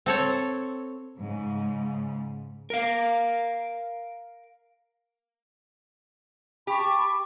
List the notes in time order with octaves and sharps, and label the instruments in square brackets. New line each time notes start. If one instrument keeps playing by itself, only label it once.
[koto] C4 A4 C#5
[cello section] G#2 C#3
[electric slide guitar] A#4 F5
[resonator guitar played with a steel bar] G4 [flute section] A5 B5 C#6